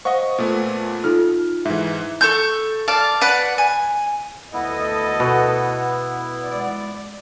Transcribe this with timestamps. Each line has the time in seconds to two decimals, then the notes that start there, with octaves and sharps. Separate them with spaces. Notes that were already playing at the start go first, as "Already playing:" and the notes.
0.05 C5 D#5 F5 F#5 C#6
0.38 A#2 A3 B3
1.04 D#4 F4 A4 F6
1.65 G#2 E3 E5
2.21 A4 C#6 G6
2.88 D5 F5 A5 D6
3.21 B4 D5 F#5
3.58 G#5
4.53 D2 B3 E4 A4 D#5
5.20 B2
6.44 G#3 D5